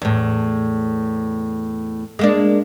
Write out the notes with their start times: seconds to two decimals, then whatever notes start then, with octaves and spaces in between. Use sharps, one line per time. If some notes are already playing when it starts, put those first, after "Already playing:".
0.02 E2 A2
2.19 G#3 A#3 D4